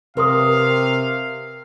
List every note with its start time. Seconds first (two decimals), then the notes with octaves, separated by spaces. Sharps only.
0.17 C3 A#4 B4 F5 C6 D#6